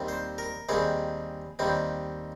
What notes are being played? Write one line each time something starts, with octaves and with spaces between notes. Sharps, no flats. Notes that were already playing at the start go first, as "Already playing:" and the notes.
Already playing: D#2 D#3 G3 C4
C5
A#4
D#2 D#3 G3 C4 G#4
D#2 D#3 G3 C4